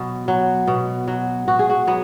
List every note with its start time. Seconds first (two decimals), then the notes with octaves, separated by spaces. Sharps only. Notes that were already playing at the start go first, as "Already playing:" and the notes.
Already playing: B2 F#3
0.28 F#3
0.67 B2
1.08 F#3
1.48 B2 F#4
1.59 G#4
1.70 F#4
1.87 F#3 B3